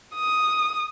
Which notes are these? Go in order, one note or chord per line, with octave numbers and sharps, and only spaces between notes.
D#6